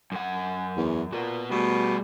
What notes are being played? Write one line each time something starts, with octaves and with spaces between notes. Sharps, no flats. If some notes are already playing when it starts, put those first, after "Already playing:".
F#2 F#5
E2
A#2 B3 F#4
B2 G3 A3